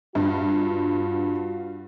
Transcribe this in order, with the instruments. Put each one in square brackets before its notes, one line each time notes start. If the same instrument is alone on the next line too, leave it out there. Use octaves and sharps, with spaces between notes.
[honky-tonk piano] G2 [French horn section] F4 F#4